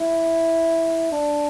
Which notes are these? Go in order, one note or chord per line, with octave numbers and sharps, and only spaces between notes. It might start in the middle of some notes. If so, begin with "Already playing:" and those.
Already playing: E4
D4